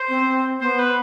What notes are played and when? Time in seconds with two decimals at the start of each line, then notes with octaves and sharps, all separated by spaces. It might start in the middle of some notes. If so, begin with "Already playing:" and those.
Already playing: C5
0.08 C4
0.60 B3 C5
0.78 B4